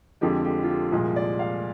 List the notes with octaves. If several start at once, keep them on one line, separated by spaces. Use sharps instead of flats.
F2 D3 F3 G#3 G4
G4
F4
G4
C2 A#2 F3 G#3
D5
F5